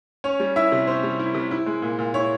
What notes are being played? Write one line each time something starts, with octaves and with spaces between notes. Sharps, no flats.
C#4 C#5
G3
E4 E5
C3
C#4 C5
G3
E4
C3
E4
G#3
A#2
A#2
E4 C#5